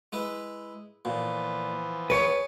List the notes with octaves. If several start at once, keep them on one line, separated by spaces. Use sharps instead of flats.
G#3 E4 B4
A#2 E3 F3 B3
G#4 B4 C#5 A5